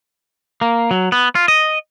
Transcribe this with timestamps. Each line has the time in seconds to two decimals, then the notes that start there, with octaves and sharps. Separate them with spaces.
0.61 A#3
0.91 F#3
1.12 B3
1.35 F4
1.48 D#5